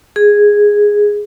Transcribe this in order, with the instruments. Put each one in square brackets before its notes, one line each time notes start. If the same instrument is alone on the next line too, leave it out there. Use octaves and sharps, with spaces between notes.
[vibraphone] G#4